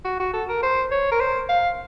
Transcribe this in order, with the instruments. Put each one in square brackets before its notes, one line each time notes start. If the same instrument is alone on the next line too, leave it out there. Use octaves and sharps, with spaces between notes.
[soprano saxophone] F#4
F#4
A4
A#4
C5
C#5
A#4
C5
F5